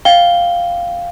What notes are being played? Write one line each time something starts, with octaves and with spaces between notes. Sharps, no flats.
F5 G5 G7